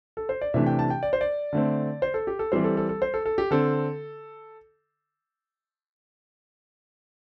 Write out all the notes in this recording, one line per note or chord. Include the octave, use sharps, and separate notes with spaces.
A4
C5
D5
C3 E3 A3 D4 E5
G5
A5
G5
D5
C5
D5
D3 A3 C4
C5
A4
G4
A4
E3 G3 C4 C5
A4
A4
A4
C5
A4
A4
G4
D3 C4 A4